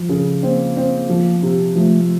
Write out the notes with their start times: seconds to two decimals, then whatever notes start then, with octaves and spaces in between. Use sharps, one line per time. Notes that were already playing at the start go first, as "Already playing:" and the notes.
Already playing: F3
0.09 C#3
0.43 A#3 C4
0.77 C4
1.09 F3
1.42 C3
1.75 F3 A3